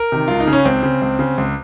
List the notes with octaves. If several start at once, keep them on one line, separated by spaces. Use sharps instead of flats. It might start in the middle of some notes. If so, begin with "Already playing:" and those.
Already playing: A#4
C3 D#3
C#2 F4
D#4
C#3
C#4
C#2 C4
C#3
C#2
C#3
C#2